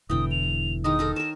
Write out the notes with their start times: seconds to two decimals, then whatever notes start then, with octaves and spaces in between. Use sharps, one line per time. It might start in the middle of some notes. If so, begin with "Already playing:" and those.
0.10 E1 B2 D3 E3 G5 D#6
0.31 F7
0.84 D#3 G#3 D#4 D#6
0.99 D#3 A4 A#4
1.16 A#4 C#5 E7